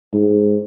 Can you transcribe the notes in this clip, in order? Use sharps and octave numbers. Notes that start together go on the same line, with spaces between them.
G#2